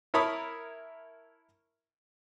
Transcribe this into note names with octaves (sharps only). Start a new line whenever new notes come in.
E4 A#4 C#5 A5 B5 D#6